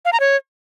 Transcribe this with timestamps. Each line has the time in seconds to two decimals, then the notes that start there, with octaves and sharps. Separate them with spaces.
0.05 F5
0.13 A#5
0.20 C#5